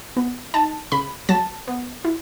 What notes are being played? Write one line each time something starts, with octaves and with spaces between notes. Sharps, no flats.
B3
D#4 A5
C#3 B5
F#3 A5
B3
E4